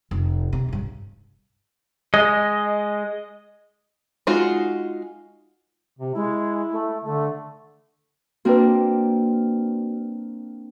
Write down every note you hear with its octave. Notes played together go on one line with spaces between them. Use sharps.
F1
C3
G2 C#3
G#3 D#5
G#3 D#4 F4 F#4
C3
G#3 E4
A3
D3 A3
A#3 C4 D4 F#4 B4